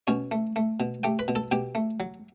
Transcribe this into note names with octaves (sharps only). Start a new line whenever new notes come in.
B2 C#4 C#5
A3
A3
B2
A3 G4 G5
B4 B5
B2
A4 A5
B2 G4 G5
A3
F#3